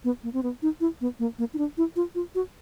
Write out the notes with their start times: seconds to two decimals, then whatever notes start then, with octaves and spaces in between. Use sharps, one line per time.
0.04 B3
0.23 A#3
0.33 C4
0.43 B3
0.62 D#4
0.81 E4
1.01 B3
1.19 A#3
1.39 A#3
1.54 D#4
1.58 D4
1.78 E4
1.96 F4
2.15 F4
2.35 F#4